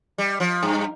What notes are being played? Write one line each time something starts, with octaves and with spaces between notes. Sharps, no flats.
G3
F3
G2